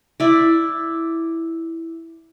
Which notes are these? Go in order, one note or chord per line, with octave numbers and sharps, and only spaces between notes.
E4 D5